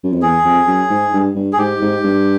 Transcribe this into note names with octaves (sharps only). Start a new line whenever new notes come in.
F#2
F2
E2 G#4
F2
F#2
G#2
G2
G2
G#4
G#2 G4
G#2
G2